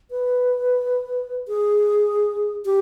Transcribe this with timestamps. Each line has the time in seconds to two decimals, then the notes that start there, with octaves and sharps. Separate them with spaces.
0.11 B4
1.48 G#4
2.65 G4